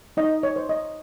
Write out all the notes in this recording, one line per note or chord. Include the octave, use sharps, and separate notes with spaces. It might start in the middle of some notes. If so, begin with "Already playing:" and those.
D#4 D#5
C#5
C5
D#5